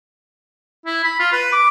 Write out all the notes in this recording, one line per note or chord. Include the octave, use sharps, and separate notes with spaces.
E4
B5
F4
B4
D6